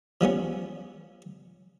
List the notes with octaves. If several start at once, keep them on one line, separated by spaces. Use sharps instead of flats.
F3 G3 B3 C#4